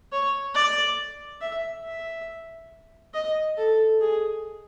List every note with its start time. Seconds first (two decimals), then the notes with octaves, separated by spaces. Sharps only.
0.12 C#5
0.55 D5
1.41 E5
1.84 E5
3.14 D#5
3.57 A4
4.01 G#4